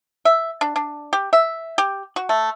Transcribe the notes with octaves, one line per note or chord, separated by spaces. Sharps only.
E5
D4
D4
G4
E5
G4
F#4
A3